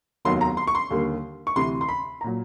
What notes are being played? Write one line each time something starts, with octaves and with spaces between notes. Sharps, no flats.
F1 D#2 D#3 F#3 B3 C6
A#5
C6
C#6
C6
D#2 D3 G3 A#3
C#6
D2 C3 E3 C6
C6
B5
A#5
A#2 F#3